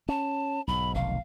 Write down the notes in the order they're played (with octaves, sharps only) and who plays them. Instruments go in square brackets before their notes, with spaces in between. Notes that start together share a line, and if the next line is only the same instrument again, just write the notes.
[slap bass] C#4 [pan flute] A5
[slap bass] B1 G#2 [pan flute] B5
[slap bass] F1 B1 D#3 [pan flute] F5